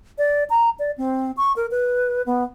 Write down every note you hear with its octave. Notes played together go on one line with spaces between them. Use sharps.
D5
A#5
D5
C4
C#6
A#4
B4
B3